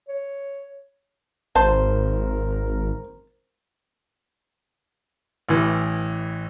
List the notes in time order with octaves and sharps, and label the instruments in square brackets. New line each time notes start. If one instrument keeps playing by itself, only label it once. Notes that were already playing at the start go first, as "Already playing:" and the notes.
[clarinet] C#5
[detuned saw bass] G#1 [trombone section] A#4 [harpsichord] C5 [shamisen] A5
[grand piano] A1 E3